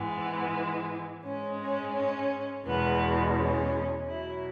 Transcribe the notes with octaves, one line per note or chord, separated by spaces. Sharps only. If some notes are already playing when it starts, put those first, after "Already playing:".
Already playing: G#2 E3 G#3 B3
G#2 G#3 C#4
C#4
C#4
E2 B2 G#3 B3
C#4
B2 F#3 E4